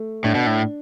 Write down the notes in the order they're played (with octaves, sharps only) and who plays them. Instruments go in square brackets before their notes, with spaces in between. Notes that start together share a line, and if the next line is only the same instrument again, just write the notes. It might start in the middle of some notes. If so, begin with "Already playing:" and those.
Already playing: [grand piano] A3
[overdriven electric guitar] A2 [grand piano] D4
[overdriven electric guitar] B2
A2